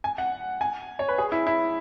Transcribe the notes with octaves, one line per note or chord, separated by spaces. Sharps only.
G#5
F#5
G#5
C#5
B4
G#4
E4
E4